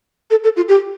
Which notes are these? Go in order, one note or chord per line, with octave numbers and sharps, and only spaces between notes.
A4
A4
F4
G4